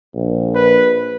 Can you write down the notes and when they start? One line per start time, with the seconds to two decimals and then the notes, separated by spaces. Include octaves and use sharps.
0.15 A#1
0.55 B4